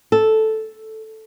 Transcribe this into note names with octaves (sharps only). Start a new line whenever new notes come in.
A4